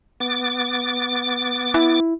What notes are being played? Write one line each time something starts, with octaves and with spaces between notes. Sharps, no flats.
B3 D6 A6
E4